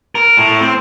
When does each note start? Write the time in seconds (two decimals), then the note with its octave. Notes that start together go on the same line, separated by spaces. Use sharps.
0.15 A#4
0.37 A2
0.61 C4